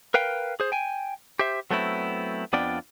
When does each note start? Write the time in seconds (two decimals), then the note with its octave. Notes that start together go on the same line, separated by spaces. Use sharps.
0.14 A#4 B4 F5 G5
0.60 G#4 C5
0.72 G5 G#5
1.39 G4 C5 E5
1.70 F#3 A3 B3 C4 E4
2.53 F2 B3 D4 F4 D5 G5